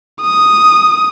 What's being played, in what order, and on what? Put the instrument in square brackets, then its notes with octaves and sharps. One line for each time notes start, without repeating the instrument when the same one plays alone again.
[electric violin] D#6